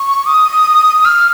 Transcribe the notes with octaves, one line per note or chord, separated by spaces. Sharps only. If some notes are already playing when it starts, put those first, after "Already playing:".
Already playing: C#6
D#6
F6